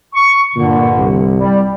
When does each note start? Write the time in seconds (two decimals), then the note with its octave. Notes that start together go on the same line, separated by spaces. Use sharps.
0.15 C#6
0.56 G2 A#2 D3
0.96 C2
1.39 G3